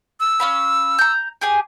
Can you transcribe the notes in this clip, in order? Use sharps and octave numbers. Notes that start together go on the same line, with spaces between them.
E6
C#4 F5 B5
A#5 G6
G4 G#4 G#5